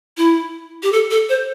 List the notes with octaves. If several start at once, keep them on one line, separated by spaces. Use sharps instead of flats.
E4
G4
A4
A4
C5